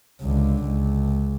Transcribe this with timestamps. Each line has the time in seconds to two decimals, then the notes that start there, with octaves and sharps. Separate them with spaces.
0.22 C#2 D3
0.64 C#2